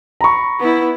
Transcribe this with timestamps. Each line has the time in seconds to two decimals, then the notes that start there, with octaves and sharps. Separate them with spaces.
0.21 A#5 B5 C#6
0.59 B3 E4